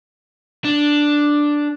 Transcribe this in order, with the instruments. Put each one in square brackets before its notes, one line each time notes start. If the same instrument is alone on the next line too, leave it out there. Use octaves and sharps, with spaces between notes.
[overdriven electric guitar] D4